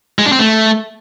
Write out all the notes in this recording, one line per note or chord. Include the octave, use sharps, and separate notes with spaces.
G#3
D4
C4
A3